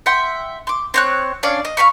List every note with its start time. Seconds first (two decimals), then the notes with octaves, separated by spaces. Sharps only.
0.06 E5 F#5 G5 C6
0.67 C6 D6
0.94 C4 C#5 F#6
1.43 C#4 D4 D5 F5
1.65 D#5
1.77 F5 G#5 B5 C#6